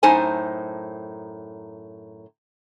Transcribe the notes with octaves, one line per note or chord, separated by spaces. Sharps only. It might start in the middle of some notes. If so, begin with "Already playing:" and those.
F#2 A2 D#4 C5 G#5 A5